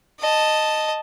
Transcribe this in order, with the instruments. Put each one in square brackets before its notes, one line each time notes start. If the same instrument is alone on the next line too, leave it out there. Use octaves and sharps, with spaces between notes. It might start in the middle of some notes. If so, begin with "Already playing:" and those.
[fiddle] D#5 A5